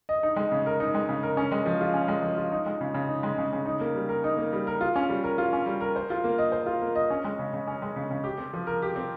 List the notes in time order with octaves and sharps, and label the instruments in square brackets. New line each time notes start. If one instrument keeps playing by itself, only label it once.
[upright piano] D#5
D#4
G#3
C#3
A#4
D#4
G#3
C#3
A#4
C#4
G#3
F3
F4
C#4
G#3
F3
F4
D#4
G#3
C#3
C#3
D#4
G#3
C#3
C#3
D#4
A#3
G3
A#4
D#4
A#3
G3
A#4
F4
C#4
G3
A#4
F4
C#4
G3
A#4
C5
F4
A#3
D#5
C5
F4
A#3
D#5
C#4
G#3
C#3
C#3
C#4
G#3
C#3
C#3
G4
C4
F3
A#4
G4
C4